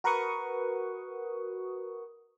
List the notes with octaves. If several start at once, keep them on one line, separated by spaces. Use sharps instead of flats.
F#4 A#4 B4 F#5 C#6 D#6